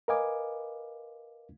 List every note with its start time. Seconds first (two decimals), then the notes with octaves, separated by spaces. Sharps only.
0.08 A#4 B4 D#5 F5 G#5 D6